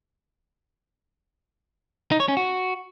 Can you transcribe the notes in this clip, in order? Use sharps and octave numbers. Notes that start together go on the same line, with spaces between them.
D#4
C#5
C#4
F#4